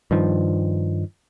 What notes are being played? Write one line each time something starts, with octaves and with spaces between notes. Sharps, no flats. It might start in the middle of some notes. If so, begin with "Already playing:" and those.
G2 D#3 F3